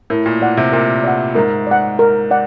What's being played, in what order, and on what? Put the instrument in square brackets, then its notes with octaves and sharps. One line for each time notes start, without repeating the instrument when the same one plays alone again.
[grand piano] A2 [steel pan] A#4
[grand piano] A#2
[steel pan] D5 F#5
[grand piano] C3
[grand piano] A#2 [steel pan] A#4
[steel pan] D5 F#5
[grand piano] G#2 [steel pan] A#4
[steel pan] D5 F#5
A#4
D5 F#5